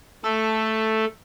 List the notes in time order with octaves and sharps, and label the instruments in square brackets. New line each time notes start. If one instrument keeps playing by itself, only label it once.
[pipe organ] A3 [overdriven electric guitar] A4